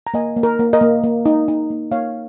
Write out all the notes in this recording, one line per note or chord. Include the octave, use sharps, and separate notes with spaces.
A#5
A#3 D#5 G#5
A#3
A#4
A#3
A#4 D#5
A#3
A#3
D#4
D#4
A#3
A#3 C#5 F5